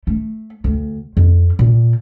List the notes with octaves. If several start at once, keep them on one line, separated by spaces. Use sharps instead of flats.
A3
D2
F2
A#2